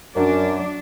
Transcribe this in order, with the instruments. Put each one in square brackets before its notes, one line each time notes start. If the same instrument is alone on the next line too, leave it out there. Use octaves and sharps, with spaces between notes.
[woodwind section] F#2 [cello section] F#3 D4